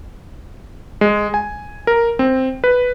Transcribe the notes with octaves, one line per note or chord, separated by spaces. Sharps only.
G#3
G#5
A#4
C4
B4